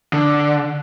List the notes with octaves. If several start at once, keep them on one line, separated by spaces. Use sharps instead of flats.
D3